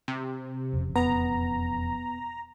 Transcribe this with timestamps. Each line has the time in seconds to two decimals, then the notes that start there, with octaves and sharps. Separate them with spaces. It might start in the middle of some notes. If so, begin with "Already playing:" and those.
0.08 C3
0.73 E1 F2 C#3
0.96 B3 A#5